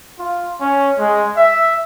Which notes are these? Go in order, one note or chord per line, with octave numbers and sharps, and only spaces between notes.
F4
C#4
G#3
E5